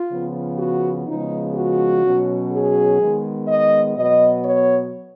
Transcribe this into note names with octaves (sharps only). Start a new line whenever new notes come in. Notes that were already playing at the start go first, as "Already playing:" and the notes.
Already playing: F4
C#3 F3 B3
F#4
C#3 F3 G#3 B3 D#4
F#4
B2 F#3 C#4
G#4
D#3 G#3 B3
D#5
B2 F#3 B3 D#5
C#5